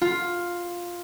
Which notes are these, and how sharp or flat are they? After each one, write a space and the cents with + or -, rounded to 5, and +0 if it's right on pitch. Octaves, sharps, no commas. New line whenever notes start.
F4 +5